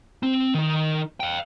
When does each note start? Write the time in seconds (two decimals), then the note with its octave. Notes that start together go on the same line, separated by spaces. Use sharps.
0.23 C4
0.54 D#3 D#4
1.20 F5 G5